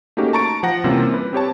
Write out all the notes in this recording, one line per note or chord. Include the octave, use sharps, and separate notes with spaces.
A3 A#3 C#4 D#4 F#4 G4
A5 A#5 C#6 A6 D7
F3 F#5 A#6
C3 E3 G3 A#3 C#4 F4
B4
C4 G4 C#5 A5